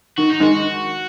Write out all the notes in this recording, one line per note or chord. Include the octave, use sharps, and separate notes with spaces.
D#3 F#4
D#4
D#3 G#3 F#4